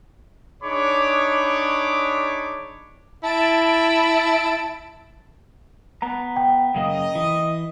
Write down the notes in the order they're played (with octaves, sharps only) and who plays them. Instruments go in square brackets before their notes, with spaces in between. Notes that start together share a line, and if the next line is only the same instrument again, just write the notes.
[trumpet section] D4 D#4 G#4 C#5 B5 D6
[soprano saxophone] E4 [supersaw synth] A5 D7
[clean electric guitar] B3 A#5
[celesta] G5
[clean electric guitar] F#2 C#3 A#3 [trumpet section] D#5
[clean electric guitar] E3